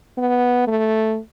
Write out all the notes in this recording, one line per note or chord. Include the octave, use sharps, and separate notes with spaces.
B3
A3